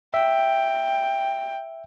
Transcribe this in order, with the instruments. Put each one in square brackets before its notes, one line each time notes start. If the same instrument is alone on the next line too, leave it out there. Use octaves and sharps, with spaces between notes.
[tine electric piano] E5 [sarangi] G5